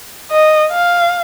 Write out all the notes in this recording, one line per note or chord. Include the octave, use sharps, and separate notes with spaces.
D#5
F5